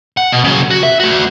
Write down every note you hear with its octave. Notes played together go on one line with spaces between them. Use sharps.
F#5
B2
C#3 F#3
F#4
E5
A3 F#4